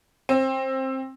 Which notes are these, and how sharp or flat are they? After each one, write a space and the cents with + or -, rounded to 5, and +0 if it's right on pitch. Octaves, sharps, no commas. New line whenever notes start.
C4 +20